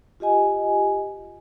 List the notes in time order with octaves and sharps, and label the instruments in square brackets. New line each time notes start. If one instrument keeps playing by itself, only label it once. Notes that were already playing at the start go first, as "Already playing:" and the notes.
[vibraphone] F4 G4 D#5 G#5